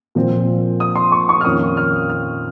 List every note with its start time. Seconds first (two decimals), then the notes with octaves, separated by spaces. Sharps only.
0.15 A#2 F3 C4
0.80 D#6
0.95 C6
1.12 C#6
1.29 C#6
1.41 F6
1.45 F2 D#3 A#3 C#4 D#6
1.77 F6
2.09 F6